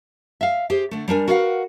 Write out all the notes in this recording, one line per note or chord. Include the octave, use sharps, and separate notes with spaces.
E5 F5
G4 G#4 C5
D3 A3
G3 D4 A#4 G#5
F#4 A#4 B4 D5 F5 F#5